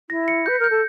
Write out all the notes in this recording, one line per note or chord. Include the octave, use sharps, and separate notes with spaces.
E4 A#6
C#7
B4 G6
A#4 G6
A4